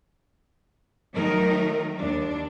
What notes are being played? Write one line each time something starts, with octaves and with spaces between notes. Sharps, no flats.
D#3 F#3 A3 D#4 A#4
D#2 D4